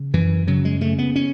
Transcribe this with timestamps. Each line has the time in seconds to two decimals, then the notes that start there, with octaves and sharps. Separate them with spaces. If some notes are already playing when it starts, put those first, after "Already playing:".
Already playing: C#3
0.13 F#2 E3
0.47 C#3 F#3
0.65 G#3
0.81 C#3 A3
0.98 B3
1.16 C#4